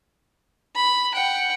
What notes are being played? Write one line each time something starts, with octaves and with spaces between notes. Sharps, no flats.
B5
F#5 G5